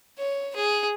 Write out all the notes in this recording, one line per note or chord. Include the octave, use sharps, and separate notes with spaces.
C#5
G#4